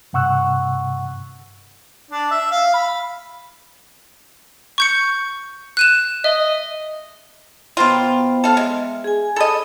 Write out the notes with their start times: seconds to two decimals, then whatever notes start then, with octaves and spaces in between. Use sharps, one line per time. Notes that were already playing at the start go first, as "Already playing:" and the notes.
0.13 G2 C3 F#5 C#6 E6 F#6
2.11 D4
2.31 E5
2.51 F5
2.74 B5
4.78 C#6 G6 C#7
5.77 F#6 D#7 E7
6.24 D#5 E5
7.77 B2 A#3 B3 F4 C5 G5
8.44 A4 F5
8.57 G#3 E5
9.04 G#4 G#5
9.36 A4 D#5 B5